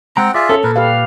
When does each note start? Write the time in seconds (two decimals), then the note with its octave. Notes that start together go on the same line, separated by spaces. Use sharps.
0.17 G#3 C4 F#5 G5 A#5
0.34 F4 G#4 D5 E5
0.49 C#4 A4
0.64 A#2 A#4 B4
0.76 G3 G4 B4 F5